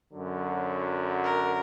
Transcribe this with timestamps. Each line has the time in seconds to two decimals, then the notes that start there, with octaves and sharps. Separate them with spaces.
0.12 F#2 D3 F#3
1.24 A#4